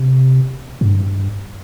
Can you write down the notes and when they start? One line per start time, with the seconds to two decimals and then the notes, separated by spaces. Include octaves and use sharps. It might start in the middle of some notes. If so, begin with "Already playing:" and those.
Already playing: C3
0.81 G2